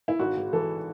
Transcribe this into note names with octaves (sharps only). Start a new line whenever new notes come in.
E4
G#1 F#4
G#2
E3 A4